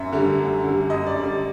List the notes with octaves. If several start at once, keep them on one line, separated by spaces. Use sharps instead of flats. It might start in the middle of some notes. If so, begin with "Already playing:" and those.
Already playing: F#2 E5
D3 G3
F#2
D3 G3
F#2 D#5
D5
D3 G3
D5